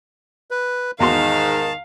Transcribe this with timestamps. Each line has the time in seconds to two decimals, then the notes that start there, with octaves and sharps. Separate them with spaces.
0.51 B4
1.00 E2 G#2 D#3 F#4 F5 A5 C6